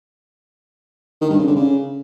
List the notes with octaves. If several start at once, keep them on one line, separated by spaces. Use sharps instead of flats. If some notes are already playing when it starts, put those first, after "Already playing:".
D#3
G2
C#3
D3
C#3